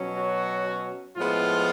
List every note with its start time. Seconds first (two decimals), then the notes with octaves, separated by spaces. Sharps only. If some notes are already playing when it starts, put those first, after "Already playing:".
Already playing: B2 F#3 C#4
0.15 F#4
1.16 A2 F3 G#3 B3 F4